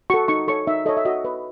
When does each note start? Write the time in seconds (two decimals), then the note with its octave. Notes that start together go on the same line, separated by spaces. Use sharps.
0.10 F#4 A4 C#6
0.28 D#4 C#6
0.48 A4 C#5 C#6
0.67 D#4 E5
0.86 A4 D#5
0.89 C#5
0.97 E5
1.05 F#4 D#5
1.25 B4